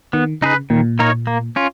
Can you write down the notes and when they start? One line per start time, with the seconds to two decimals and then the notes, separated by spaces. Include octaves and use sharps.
0.13 D#3 B3
0.42 C#3 D#4 G#4 B4
0.70 A#2 D#3
0.99 A#3 D#4 A#4 C#5
1.27 A#3
1.56 C#4 F4